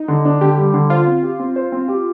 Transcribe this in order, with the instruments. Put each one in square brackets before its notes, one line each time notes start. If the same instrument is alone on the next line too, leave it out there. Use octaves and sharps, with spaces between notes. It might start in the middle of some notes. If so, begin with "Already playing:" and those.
Already playing: [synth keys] D#4
[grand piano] D3
D4
[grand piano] D3 [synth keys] G4
[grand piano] G3
D3
[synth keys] F4 [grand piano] C5
[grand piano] C4
G4
C4
C5
C4
G4